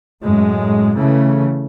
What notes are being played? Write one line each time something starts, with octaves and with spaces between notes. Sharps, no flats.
F#2 A2 G#3
C#3 E3 A3